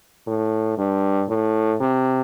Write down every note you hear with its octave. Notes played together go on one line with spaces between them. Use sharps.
A2
G2
A2
C3